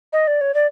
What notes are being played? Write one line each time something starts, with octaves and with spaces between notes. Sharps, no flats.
D#5
D5
C#5
D5